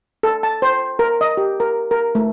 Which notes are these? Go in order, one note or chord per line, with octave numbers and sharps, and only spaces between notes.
A4
A5
C5
A#4
D#5
G4
A#4
A#4
A3